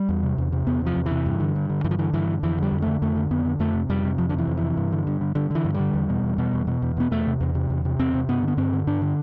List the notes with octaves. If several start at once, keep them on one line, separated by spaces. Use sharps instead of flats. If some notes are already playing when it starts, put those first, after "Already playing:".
Already playing: G3
E2
C3
E2
C3
E2 B3
C3
F3
E2
C3 E3
G2
D3
G2
D3
G2 E3
F3
D3 E3
G2 E3
D3
F2 E3
D3 G3
F2
D3 A3
F2 A3
D3
F2 B3
D3
F2 A3
C3
F2 G3
C3
F2 F3
D3
C3
E3
F2
E3
C3
G2
D3
G2
D3
G2 D3
D3 E3
G2
D3 G3
E2
B2
E2
B2
E2
B2
E2
B2 B3
E2 A3
C3
E2
C3
E2
C3
E2 C4
C3
G2 B3
D3 B3
G2 C4
D3
G2 D4
D3